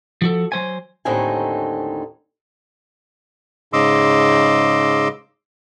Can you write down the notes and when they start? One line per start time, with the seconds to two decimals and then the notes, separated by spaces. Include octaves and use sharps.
0.22 F3 F#4 A4
0.52 F#3 C5 G#5
1.05 D#2 A2 D3 C4 D#4 G#5
3.73 G#2 C#3 D#5 C6 D6 E6